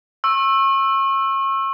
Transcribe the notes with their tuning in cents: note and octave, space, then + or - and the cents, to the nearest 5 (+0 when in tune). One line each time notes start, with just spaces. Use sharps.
C#6 -35 E6 +0